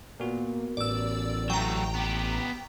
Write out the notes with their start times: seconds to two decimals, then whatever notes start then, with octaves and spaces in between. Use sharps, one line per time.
0.20 A#2 B3 F#4 A#4
0.77 A1 D5 E6
1.50 F#3 A3 G5 A#5 C#6
1.95 B3 G4